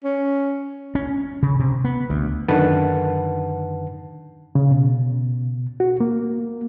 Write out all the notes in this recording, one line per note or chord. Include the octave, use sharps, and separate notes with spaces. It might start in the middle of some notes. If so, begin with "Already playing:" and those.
C#4
C#4
C#3
C3
B3
D2
F#2 D3 D#3 B4 F#5 A5
C#3
B2
F#4
A#3